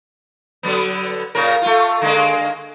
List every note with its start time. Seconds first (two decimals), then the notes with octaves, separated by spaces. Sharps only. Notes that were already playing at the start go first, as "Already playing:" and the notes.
0.63 D3 F#3 B3
1.35 A#2 C#3 A#4
1.62 A3 F4
2.01 D3 G#3 A#3